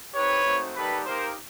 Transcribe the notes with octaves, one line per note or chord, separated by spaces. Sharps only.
C4 D#4 G4 B4 C#5
A3 C4 D#4 F#4
G3 A#3 D#4 G4 A4 B4
A#3 D#4 G4 A#4 C5